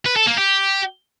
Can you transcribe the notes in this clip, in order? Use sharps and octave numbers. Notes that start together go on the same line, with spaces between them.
B4
A4
A#3
G4